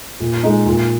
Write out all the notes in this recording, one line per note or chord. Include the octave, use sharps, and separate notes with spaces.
A#2
G#3 D#4
A#2